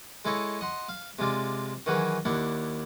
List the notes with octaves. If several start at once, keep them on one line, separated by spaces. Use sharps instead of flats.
G#3 E4 A4 C#5 D#5
D#5 F#5 C6
F5
C3 G#3 F4 D5
D#3 E3 F#3 F#4 G#4 B4
D#2 D4 E4 F#5